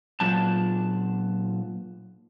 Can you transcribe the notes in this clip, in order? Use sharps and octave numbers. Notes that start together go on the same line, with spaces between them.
A#2 F#3 A5